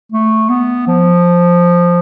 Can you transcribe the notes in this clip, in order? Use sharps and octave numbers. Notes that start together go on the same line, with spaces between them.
A3
B3
F3